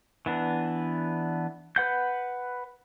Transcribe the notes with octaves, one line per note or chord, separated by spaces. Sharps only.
E3 B3 D4
B4 F#5 G6